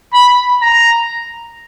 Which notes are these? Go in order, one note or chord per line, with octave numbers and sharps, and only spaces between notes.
B5
A#5